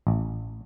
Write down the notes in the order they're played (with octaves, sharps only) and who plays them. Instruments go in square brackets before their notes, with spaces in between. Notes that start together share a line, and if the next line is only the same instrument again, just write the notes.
[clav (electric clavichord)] A1